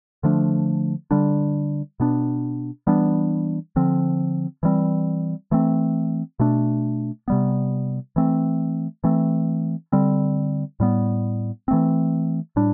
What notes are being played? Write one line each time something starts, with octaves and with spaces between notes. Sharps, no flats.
D3 F3 A3 D4
D3 G3 D4
B2 B3 D4
E3 G3 B3 D4
D3 F3 C4
E3 G3 C4
E3 A3 C4
B2 A3 D4
C3 G3 B3
E3 A3 C4
E3 A3 C4
D3 G3 C4
A2 G3 B3
E3 A3 C4
A2 G3 D4